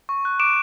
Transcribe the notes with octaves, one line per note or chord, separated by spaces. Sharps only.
C#6
F#6
D6 D7 E7